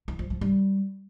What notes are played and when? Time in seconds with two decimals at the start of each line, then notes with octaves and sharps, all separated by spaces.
0.08 E3
0.19 F3
0.30 F3
0.41 G3